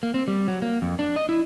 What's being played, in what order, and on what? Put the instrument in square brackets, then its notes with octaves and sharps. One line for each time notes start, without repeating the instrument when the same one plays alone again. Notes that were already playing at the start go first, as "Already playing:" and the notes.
[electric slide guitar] A#3
C4
G3
F#3
A#3
F2
D4
D#5
E4